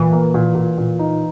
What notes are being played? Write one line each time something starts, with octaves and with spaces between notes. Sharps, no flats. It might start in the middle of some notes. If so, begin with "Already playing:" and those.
Already playing: A#2 E3
A#3
A#2
A#2
A#2
D#4